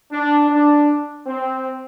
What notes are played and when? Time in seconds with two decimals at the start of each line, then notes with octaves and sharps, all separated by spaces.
0.12 D4
0.50 D4
1.27 C4